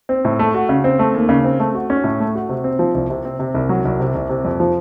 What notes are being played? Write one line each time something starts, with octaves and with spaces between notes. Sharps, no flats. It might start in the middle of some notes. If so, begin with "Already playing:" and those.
C4
A2
A3
F#4
C#3
C4
A3
D#2
C#3
C4
A3
F#4
C#4
A2
A3
F#4
C3
C4
F3
C2
C3
C4
C3
C2
F#3
C2
C3
C2
C3
F2
F3